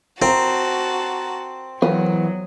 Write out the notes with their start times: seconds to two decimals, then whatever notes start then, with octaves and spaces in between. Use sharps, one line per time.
0.22 C4 F#4 A5 A#5
1.82 E2 F#3 B3 D#6